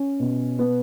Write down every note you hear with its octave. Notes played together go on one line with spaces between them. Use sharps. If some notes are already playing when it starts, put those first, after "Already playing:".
Already playing: C#4
B2
B3